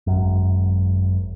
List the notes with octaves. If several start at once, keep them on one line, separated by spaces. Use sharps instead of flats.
G#1 F#2